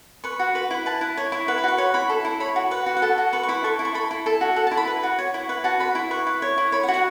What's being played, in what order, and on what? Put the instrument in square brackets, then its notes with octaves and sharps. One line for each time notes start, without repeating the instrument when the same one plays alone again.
[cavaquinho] B4 C#6
F#4
B4 B5
E4
B4 A5
E4
C#5
E4
B4 F#5
B5
F#4 C#6
C#5 B5
E4 B5
A4
E4
C#5 B5
F#4
B4 F#5
F#4
F#5
A4 A5
F#4
B4 C#6
C#6
E4 B5
A4 C#6
E4
C#6
A4 B5
E4
A4 A5
F#4
A4 F#5
A5
E4
B5
B4
F#4
C#5
E4
B4 F#5
F#4 A5
B4 B5
E4
B4 C#6
E4
C#5
E4
C#5 B5
F#5
F#4
F#5